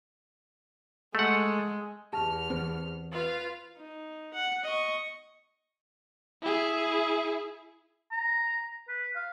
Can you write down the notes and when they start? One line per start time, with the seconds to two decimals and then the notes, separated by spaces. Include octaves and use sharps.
1.15 G#3 A3 F#5
2.13 E2 G4 A5 F6
2.50 E3 C4 C5
3.11 F4 B4 F5
3.77 D#4
4.34 F#5
4.64 D#5 C#6
6.42 E4 G#4
8.12 A#5
8.88 B4
9.16 F5